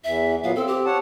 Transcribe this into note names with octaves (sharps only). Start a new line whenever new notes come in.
E2 E5
A#2 F#3 B3 F5
C4 A4
G4
C#5 F#5 A5